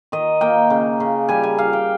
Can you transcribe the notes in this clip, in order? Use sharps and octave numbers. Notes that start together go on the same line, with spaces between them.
D#3 D#5
A#3 G5
C#3
C#3
G3 G#5
G#5
G3 F5
G5